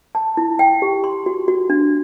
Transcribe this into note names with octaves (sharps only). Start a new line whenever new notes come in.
A5
E4
G5
G4
C6
F#4
F#4
D4